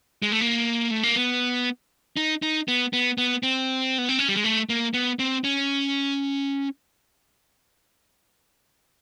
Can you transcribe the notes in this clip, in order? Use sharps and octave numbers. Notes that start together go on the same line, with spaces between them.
G#3
A3
A#3
A3
A#3
B3
D#4
D#4
B3
B3
B3
C4
B3
C4
C#4
G3
G#3
A3
A#3
B3
C4
C#4